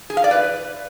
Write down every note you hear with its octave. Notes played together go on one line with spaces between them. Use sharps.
G#4
F5
D5
B4